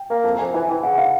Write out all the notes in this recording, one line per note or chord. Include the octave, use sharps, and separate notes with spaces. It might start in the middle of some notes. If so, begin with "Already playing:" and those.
Already playing: G5
A#3
F2 A5
F2 G#5
E3 G#5
E3 G5
C#3 F#5
F5